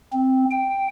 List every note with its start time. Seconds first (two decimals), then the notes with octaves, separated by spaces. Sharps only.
0.13 C4
0.50 G5